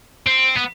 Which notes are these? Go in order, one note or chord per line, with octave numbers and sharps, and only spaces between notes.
C4
B3